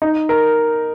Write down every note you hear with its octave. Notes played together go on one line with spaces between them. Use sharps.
D#4
A#4